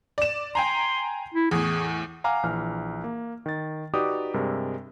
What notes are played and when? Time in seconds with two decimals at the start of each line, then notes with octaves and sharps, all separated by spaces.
0.18 D5 E7
0.55 G5 G#5 A#5 C6
1.34 E4
1.51 E2 A2 G#4
2.24 F5 F#5 G#5 A#5 D6 F6
2.43 A#1 E3 F6
3.04 A#3
3.46 D#3 A6
3.94 D#4 F#4 G4 B4 D5 D#6
4.34 G2 C3 G#3 A#4